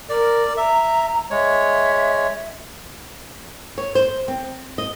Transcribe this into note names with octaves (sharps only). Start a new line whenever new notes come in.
A#4 D5
E5 A#5
G#3 C#5 E5
C#5
C5
C4
D#5